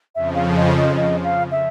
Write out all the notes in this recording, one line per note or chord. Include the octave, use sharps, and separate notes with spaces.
F2 C#3 F3 E5
F5
D#5
D#5
D#5
F5
E5